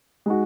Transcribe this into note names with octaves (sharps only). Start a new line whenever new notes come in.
G#3 D#4 F#4